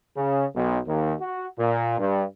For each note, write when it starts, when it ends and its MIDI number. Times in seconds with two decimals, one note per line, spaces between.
0.16 0.45 49
0.55 0.78 35
0.86 1.13 39
1.20 1.46 66
1.57 1.97 46
1.98 2.23 43